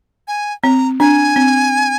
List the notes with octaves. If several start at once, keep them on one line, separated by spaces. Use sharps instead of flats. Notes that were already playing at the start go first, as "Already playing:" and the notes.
G#5
C4 A#5
D4 G#5
C4